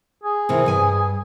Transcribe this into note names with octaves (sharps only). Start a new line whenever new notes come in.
G#4
C3 D#3 E3
G2 G#5